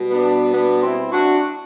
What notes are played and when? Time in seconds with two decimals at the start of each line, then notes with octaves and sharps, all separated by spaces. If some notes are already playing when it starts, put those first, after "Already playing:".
Already playing: B2 G3
0.11 B3 D4
0.54 B3 D4
0.83 C4 E4
1.12 D4 F#4